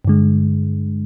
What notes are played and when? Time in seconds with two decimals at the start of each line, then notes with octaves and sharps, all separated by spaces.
0.05 G2 D3 G#3